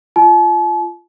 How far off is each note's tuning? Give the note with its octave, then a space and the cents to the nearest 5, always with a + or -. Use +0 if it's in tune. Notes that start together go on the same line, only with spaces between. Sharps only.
F4 -15 A5 -45